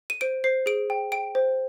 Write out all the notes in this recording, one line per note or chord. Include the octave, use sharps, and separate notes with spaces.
D#7
C5 D7
C5 C7
G#4 D7
G5
G5 D7
C5